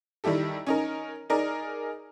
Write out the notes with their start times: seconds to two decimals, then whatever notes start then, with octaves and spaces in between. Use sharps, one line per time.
0.24 D#3 G3 E4 G4 A4
0.67 C#4 D#4 A#4
1.30 D#4 G#4 A#4 D5